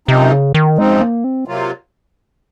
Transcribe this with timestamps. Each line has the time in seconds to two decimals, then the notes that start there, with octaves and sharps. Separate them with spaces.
0.08 F#2 C3 F3 C4 D#4
0.32 C#3
0.54 D#3
0.78 F#2 F3 G#3 C4 D#4
1.01 A#3
1.24 C4
1.47 C3 F#3 A#3 F4